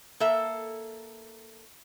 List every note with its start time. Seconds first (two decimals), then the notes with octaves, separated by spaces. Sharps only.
0.20 A#3 A4 E5